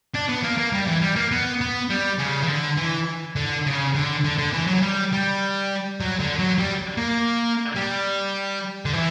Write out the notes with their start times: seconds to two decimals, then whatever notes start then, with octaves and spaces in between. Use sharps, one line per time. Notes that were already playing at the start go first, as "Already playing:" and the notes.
0.14 D4
0.29 B3
0.44 A#3
0.58 A#3
0.73 G3
0.87 E3
1.01 G3
1.16 A#3
1.31 B3
1.61 B3
1.90 G3
2.19 C#3
2.43 E3
2.48 D3
2.77 E3
3.36 D3
3.66 C#3
3.95 D3
4.25 D3
4.38 D3
4.53 E3
4.68 F#3
4.82 G3
5.13 G3
6.00 F#3
6.20 D3
6.39 F#3
6.59 G3
6.98 A#3
7.76 G3
8.85 D3
8.93 E3